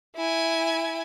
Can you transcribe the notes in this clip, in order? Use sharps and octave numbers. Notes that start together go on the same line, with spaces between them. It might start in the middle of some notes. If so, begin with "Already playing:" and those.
E4 G#5